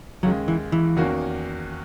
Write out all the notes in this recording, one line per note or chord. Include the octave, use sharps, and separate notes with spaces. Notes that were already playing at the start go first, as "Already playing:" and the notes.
D#2 C#3 F#3 G#3
E3
E3
E2 D#3 A#3 C#4 F#4